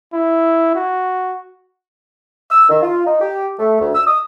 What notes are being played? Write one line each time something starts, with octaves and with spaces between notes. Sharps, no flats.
E4
F#4
E6
D#3
F4
D#4
G4
A3
D2
E6
D#6